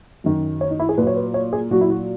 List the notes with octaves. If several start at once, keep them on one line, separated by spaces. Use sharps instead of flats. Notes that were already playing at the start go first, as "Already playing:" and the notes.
F#2 D#3 F#3
C#5
D#4
E4
G#4
A#2 F#3 B4
C#5
B4
C#5
G#4
A#2 F#3 F#4
E4
F#4